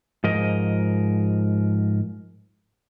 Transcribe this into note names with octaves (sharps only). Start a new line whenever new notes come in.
G#2 F3 A#4 D#5